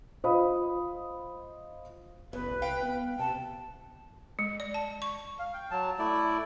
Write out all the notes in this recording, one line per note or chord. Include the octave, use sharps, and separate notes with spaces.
F4 C5 D#5 F5 B5 D#6
F#1 E2 B4
C2
F5 G5
B3
C3 A5
G#3
D5
A5
C#6
F5
G5
F#3 A5
A3 E4 D5